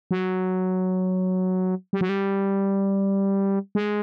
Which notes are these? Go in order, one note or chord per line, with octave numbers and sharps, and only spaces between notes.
F#3
G3
F#3
G3
G#3